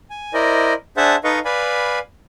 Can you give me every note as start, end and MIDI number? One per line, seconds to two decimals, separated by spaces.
0.10 0.33 80
0.34 0.73 64
0.34 0.73 70
0.34 0.73 72
0.34 0.73 74
0.34 0.73 75
0.97 1.16 62
0.97 1.16 68
0.97 1.16 72
0.97 1.16 76
0.97 1.16 78
0.97 1.16 81
1.24 1.39 63
1.24 1.39 69
1.24 1.39 71
1.24 1.39 75
1.24 1.39 77
1.24 1.39 85
1.45 1.99 71
1.45 1.99 74
1.45 1.99 77
1.45 1.99 80
1.45 1.99 83